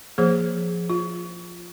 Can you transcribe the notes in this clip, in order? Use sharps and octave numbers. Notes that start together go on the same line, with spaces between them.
F3 A#3 G#4 C5
F4